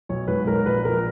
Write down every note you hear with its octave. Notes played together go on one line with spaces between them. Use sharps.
B1 C#5
G#2 B4
G#2 A#4
A#1 B4
A#1 A#4